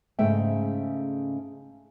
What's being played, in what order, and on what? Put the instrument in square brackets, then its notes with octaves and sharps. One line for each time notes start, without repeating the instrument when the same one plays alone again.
[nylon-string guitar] G#2 C#3 A3 E5 G5